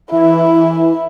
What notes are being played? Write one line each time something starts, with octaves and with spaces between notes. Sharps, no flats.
E3 E4